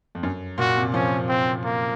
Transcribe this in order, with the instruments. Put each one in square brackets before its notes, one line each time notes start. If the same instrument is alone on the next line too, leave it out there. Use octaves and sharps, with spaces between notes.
[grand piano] F2
F#2
[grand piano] A#2 [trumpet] F#4
[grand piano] C3
[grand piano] F3 [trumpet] C#4
[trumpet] C4
A#3